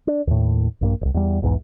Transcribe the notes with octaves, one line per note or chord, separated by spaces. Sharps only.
D4
D#2 A2
A#1 G2 A#3
D1 C2
E2 G3
B1 E2 G#2 E3